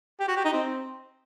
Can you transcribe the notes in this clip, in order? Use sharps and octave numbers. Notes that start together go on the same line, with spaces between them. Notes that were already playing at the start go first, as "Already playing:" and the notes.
G4
F#4
G4
D#4
C4